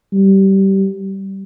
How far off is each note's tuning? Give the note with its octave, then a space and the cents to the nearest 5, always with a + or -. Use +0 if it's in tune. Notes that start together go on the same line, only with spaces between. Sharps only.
G3 -20